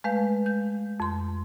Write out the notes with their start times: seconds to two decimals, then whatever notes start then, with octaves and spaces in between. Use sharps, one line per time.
0.04 G#3 A3 B4 F5 G6
0.46 G6
1.00 F2 C6